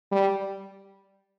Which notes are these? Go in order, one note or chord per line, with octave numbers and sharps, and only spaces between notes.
G3